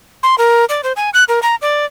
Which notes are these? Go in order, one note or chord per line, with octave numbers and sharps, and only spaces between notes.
C6
A#4
D5
C5
G#5
F#6
A#4
A#5
D5